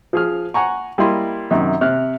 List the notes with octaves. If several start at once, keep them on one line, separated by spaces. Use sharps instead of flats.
F3 G#4 F6
F#5 G#5 A#5 C#6
G3 A#3 E4 D#5 C6
F#2 C3 D#3
C3 F6 F#6